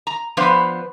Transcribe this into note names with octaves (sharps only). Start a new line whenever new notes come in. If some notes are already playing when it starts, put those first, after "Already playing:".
A#5
F3 B3 D4 B4 C5 F5